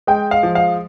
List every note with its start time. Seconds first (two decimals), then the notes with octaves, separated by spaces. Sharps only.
0.07 G#3 G5
0.31 F5
0.43 F3
0.55 F5